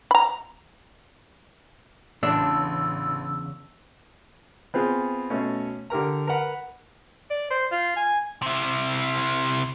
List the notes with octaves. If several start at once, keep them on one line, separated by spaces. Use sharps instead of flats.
A#5 B5
A1 E2 C#3 D4 E6
B3 C4 F4 G#4
B2 A3 C#4
D3 G4 A#4 A#5
A#4 B4 F#5
D5
C5
F4
G#5
C3 E4